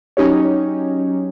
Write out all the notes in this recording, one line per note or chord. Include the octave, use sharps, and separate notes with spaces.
F#3 C#4 D#4 G4 C#5